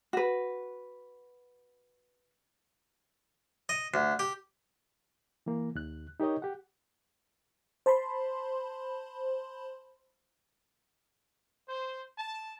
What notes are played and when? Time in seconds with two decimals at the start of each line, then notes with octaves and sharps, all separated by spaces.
0.13 F#4 B4
3.69 D#5
3.94 D2
4.19 G4
5.46 E3 A#3
5.75 D#2 F#6
6.20 D#4 G4 A#4 C#5 D#5
6.42 G4 F#5
7.86 C5 A5 B5 C6
11.69 C5
12.19 A5